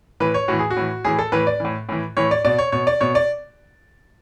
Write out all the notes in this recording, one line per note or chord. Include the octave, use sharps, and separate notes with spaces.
A2 E3 B4
C#5
A2 E3 F#4
G#4
F#4
A2 E3
A2 E3 G#4
A4
A2 E3 B4
D5
A2 E3
A2 E3
A2 E3 C#5
D5
B2 D5
C#5
B2 C#5
D5
B2 C#5
D5